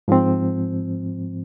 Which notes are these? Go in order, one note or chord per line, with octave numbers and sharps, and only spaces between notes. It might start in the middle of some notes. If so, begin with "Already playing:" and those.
G#2 F3 C4